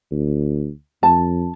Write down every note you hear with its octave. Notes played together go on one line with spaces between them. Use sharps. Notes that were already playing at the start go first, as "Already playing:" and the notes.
D2
F2 A5